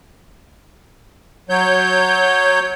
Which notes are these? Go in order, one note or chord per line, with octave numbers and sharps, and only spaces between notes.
F#3 C#5 G6